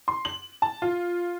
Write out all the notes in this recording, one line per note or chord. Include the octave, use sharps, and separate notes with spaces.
C6
F#7
A5
F4